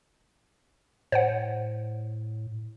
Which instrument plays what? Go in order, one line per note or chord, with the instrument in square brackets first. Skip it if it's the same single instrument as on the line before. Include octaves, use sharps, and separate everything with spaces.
[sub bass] A2 [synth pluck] C5 C#5 F#5